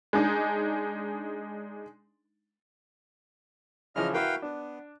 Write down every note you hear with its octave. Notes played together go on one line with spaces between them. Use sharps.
G#3 D4 D#4
C#3 E3 F3 D#5 F6
E4 F#4 A#4 B4 F5 G5
B3 D4